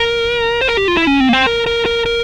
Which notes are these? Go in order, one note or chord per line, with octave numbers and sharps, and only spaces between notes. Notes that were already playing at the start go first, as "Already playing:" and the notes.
Already playing: A#4
C5
A#4
G4
F4
E4
C#4
C4
A#3
C4
A#4
A#4
A#4
A#4